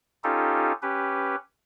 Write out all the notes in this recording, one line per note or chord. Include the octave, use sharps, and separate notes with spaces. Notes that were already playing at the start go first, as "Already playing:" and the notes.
C#4 D#4 F4 G4 A4
C#4 G4 B4